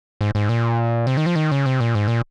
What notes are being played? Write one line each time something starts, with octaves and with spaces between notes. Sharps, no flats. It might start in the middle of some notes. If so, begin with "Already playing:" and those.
G#2
G#2
A#2
C3
D#3
F3
D#3
C#3
C3
A#2
G#2
A#2